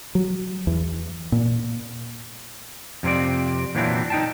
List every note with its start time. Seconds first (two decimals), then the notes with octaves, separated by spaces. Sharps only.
0.15 F#3
0.67 E2
1.32 A#2
3.03 F2 C3 C4 D5
3.75 A#2 E3 F#3 C4 D4 E4
4.10 D#4 G5 A5